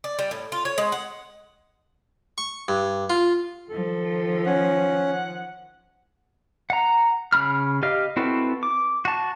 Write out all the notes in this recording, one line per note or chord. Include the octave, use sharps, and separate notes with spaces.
D5
G3
A2
F4
C#5
G#3
F#5
C#6
G2
F4
D#3 F3 A4
C#4 F#5
F#5 A#5
C#3 D4 B5 F6
G4 D#5 F5 F6
C4 E4 F#4 A4 B4
D6
F#4 A5